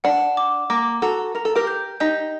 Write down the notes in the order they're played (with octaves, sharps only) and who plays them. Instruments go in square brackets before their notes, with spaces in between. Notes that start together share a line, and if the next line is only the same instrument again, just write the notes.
[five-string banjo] D4 [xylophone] F#5
[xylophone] D6
[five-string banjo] A#3 [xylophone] D6
[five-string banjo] F#4 A4 [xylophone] A#5
[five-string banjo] A#4 [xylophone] A#5
[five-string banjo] A4
G4 A#4
[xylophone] G6
[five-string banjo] D#4 G4 [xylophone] G6